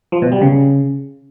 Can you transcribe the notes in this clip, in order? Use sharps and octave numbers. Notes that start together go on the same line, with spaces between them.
F3
B2
G3
C#3